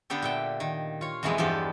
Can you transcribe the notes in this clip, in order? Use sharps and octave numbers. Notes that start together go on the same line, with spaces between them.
D3 B3 D4 G4 A4
A#2 E5 G5
D#3
F4 C#5
F2 B2 E3 F#3 G#3 B3
E2 G2 F3 G#3 G4 A4